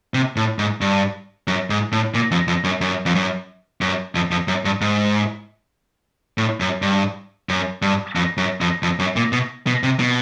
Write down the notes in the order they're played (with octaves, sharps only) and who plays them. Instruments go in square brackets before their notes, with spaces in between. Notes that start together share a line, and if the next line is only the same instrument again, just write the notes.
[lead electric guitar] C3
A2
G#2
G2
F#2
G#2
A2
A#2
F2
F2
F#2
F#2
F2
F#2
F#2
F2
F2
F#2
G2
G#2
A2
F#2
G2
F#2
G2
F2
F#2
F2
F2
F#2
A#2
B2
B2
C3
B2